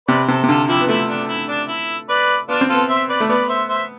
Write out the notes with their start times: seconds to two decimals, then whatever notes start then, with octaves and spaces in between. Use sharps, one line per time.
0.08 C3 B4 D5
0.28 C3 A4 C5
0.43 C3
0.48 D3 F4 A4
0.68 F3 E4 G4
0.81 B3
0.89 A3 E4
1.09 D4
1.29 E4
1.48 D4
1.68 E4
2.09 B4 D5
2.49 B3 D4 F4
2.61 C4
2.69 B3 F4 A4
2.89 C5 E5
3.09 B4 D5
3.20 A3
3.29 B3 B4 D5
3.49 C5 E5
3.69 C5 E5